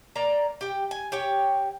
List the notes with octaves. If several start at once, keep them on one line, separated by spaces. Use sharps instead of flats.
A#3 D5 A#5
G4 G5
G#5
G4 C#5 G5